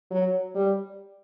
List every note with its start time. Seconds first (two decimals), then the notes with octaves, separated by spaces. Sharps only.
0.11 F#3
0.55 G3